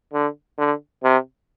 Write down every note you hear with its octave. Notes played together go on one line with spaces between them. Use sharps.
D3
D3
C3